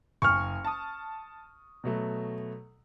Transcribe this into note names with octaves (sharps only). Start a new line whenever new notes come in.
F#1 G#5 C#6 F6
A5 D#6
B2 F#3 A3